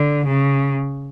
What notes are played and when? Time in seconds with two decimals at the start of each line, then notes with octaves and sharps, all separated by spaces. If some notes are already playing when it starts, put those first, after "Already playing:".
Already playing: D3
0.26 C#3